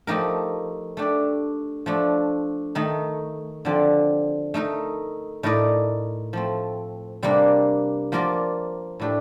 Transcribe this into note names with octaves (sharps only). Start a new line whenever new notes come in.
F3 A3 D#4 G4 A#4
A3 D4 G4 D5
F3 A3 D4
D#3 A3 D#4
D3 F3 C4 G4 D5
A3 D#4 A#4 D#5
A2 A3 D#4 A#4 D5
F3 A3 C4
C3 G3 A#3 D4
F3 A#3 F4 A#4 D5
A2 A3 D4 G4